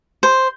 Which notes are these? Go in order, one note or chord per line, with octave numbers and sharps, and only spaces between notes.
C5